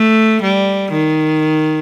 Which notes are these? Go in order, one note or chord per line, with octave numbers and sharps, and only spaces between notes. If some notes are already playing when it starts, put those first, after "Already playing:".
Already playing: A3
G3
D#3